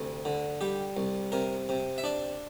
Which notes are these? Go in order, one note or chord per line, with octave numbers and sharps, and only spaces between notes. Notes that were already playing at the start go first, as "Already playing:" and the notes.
Already playing: D2 C3
D3
G3 G4
C2
C3 A#4
C3
E5
D4 D5